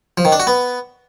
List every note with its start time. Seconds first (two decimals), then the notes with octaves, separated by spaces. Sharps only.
0.18 F3
0.25 D#3
0.32 D4
0.40 F#4
0.47 B3